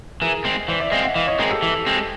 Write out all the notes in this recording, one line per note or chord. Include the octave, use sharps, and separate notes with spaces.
E3 G#4 A#4
G#3 C4
E3 C5 D5
D5 E5
G#3 C4 D#5 F5
E5 F#5
E3 D#5 F5
C#5 D#5
G#3 C4 G#4 A#4
G4 A4
E3
G#3 C4